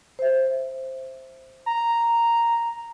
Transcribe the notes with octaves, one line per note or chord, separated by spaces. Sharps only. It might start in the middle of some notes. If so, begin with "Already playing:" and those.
C5 E5
A#5